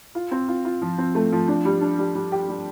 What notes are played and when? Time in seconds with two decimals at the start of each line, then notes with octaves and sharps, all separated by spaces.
0.15 F4
0.31 C4
0.48 F4
0.65 F4
0.82 F3
0.98 C4
1.15 A3
1.32 F3
1.48 D4
1.65 G3
1.81 D4
1.98 G3
2.15 G3
2.32 G4
2.49 G3